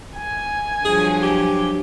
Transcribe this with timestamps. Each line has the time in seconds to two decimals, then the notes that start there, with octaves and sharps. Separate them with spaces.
0.17 G#5
0.85 G2 F3 F#3 G#4
1.22 G4